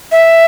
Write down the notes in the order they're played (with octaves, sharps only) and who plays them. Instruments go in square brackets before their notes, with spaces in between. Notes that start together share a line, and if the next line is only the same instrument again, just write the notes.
[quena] E5